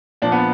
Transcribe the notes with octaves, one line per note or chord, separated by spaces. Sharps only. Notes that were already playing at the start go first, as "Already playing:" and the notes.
A#2 F3 D4
B3